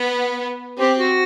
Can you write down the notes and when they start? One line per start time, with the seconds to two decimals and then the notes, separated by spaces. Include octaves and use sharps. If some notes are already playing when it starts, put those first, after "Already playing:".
Already playing: B3
0.79 C4 G4
0.98 F#4